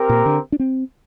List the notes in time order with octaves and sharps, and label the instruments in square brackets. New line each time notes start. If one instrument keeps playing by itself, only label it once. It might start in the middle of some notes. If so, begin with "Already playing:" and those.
Already playing: [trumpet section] C4 G4 A#4
[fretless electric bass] A#2
D3
D4
C4